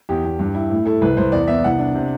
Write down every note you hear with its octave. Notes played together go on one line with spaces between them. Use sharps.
E2 G4
E2
G2
E4
A2
E4 A4
C2 B4
C2 C5
E2 D5
B3 E5
C2 F#5
D4
C3